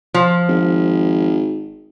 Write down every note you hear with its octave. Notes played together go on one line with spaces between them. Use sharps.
F3
G#1